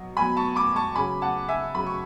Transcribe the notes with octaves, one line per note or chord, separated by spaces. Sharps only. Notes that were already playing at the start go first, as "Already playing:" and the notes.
Already playing: B2 F#3
B2 F#3 G#5 B5
A5 C#6
B5 D6
A5 C#6
C#3 F#3 G#5 B5
F#5 A5
E5 G#5
C#3 F#3 B5
C#6